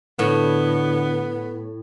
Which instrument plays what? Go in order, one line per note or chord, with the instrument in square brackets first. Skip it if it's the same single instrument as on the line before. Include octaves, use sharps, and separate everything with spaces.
[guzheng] A2 [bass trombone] D3 [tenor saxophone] B3